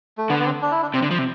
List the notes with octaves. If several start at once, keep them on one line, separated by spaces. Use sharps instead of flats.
A3
D3 B3
B3
C4
D4
E4
D4
C3 C4
D3
F3
C3